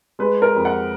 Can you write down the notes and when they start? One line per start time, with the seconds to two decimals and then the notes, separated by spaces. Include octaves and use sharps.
0.19 G#3 B4
0.42 A#4
0.55 F2
0.65 F#5